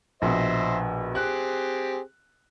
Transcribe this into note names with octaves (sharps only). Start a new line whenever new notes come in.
A#1 B2 C5 D#5 E5
C4 G4 G#4 F#6